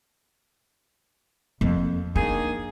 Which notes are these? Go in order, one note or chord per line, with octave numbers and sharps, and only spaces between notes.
F2 A#3
D#3 A#3 D4 G#4